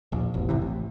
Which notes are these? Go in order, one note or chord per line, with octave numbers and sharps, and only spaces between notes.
D#1 A#1
E1 A1
A1 C3 E3
A1